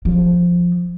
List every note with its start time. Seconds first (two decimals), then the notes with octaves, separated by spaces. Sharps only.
0.05 F3